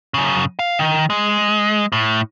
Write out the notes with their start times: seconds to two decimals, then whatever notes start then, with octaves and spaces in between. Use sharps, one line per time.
0.14 F#2 C#3
0.59 F5
0.79 D#3
1.10 G#3
1.92 A2